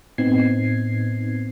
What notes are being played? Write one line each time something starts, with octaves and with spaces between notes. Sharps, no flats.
A2 B3 C4 D#4 G#6 C7